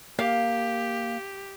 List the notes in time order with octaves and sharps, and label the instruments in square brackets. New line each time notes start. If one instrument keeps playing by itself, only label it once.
[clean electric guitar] A#3 [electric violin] G4 [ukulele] F5